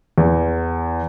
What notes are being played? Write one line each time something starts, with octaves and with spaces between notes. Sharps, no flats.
E2